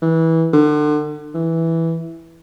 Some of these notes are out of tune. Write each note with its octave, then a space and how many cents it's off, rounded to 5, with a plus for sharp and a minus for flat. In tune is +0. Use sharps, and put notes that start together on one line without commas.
E3 -20
D3 +35
E3 -5